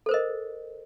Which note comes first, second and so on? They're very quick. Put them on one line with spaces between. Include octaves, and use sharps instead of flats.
A4 C5 A#4 D#5